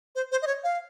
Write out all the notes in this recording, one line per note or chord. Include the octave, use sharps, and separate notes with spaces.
C5
C5
D#5
C#5
F5